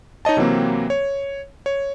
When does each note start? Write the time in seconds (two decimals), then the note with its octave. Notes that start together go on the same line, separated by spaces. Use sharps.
0.25 D#4 C#5 D#5 A5
0.37 C3 E3 F#3 A#3 C4
0.90 C#5
1.66 C#5